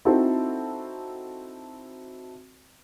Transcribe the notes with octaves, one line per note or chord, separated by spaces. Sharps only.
C4 D#4 E4 F#4 A4 C5